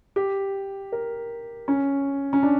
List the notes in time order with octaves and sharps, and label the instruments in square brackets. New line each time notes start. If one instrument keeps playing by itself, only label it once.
[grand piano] G4
A#4
C#4
C#4
D4